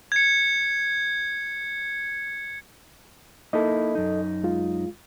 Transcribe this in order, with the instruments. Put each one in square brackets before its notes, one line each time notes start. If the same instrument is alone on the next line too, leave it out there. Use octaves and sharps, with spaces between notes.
[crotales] G#6 C#7
[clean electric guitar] A#3 D#4 E4 [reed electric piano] A4 D#5
[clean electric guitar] F#2 D#4
[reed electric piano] G#3 F4